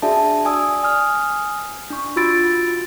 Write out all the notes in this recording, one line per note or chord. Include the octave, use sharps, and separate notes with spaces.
D4 F#4 G#4 D5 E5 A5
D5 G#5 D#6 E6
G#5 D#6 F6
D4 C#6
F4 F#4 B5 E6 A6 D7